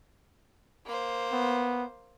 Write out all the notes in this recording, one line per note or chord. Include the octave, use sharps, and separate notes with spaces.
A#3 C5
B3